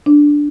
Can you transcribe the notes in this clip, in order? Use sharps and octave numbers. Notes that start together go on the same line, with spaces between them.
D4